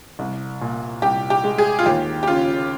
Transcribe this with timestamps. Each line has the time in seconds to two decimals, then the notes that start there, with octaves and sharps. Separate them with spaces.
0.19 C2
0.61 A#2
1.02 C2 G4
1.30 G4
1.44 G#3
1.58 G#4
1.79 F4
1.86 D#2 G4
2.23 G4
2.28 C#3 F4